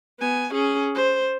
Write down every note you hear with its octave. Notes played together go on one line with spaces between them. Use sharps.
B3 G#5
C#4 G#4
C5